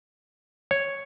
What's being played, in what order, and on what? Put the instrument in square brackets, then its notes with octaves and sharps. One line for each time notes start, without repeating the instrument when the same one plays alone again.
[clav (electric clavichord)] C#5